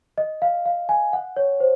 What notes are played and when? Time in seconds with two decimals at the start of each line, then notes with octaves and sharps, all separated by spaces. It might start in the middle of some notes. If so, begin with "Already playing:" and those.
0.18 D#5
0.42 F5
0.66 F5
0.89 G#5
1.13 F#5
1.37 C#5
1.60 C5